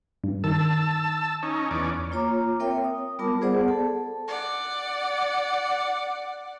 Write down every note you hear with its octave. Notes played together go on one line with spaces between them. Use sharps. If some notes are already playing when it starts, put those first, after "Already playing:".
G2
D#3 A5 E6
C#4 D#4
E2 C#4 D5
A#3 F4 C#5 A#5 D6
C4 A#4 C#5 E5 G5
D#6
G3 B3 F4 A#4 A5 D6
B3 G#4 C5 D5 F#5
A4 A5
D5 F#5